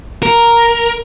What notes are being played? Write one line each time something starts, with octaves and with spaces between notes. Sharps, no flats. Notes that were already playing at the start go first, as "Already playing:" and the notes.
A#4